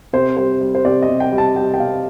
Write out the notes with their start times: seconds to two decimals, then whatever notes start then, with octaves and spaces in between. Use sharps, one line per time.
0.13 C3 C5
0.37 G3 C5
0.61 G3
0.75 C5
0.85 C3 D5
1.02 D#5
1.09 C3
1.20 G5
1.32 G3
1.38 A5
1.56 G3 G5
1.74 G5
1.80 C3 F5